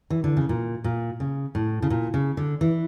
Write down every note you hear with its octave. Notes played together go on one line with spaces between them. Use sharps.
E3
D3
C#3
A#2
A#2
C#3
A2
C#3
A#2
C#3
D3
E3